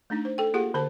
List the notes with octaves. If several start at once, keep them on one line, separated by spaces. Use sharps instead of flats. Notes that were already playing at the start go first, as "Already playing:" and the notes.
A3 D4 D#4
C5
A4 G5
A#3 F4 G4 G#4 F#5
D3 C5 A5